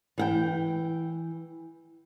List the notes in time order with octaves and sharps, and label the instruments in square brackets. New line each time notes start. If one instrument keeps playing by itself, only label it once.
[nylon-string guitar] E3 F#5 G5